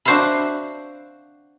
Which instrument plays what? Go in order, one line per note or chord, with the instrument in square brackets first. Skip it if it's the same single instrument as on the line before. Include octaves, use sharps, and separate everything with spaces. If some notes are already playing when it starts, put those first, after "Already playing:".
[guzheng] D4 F#4 C5 E5 F5 B5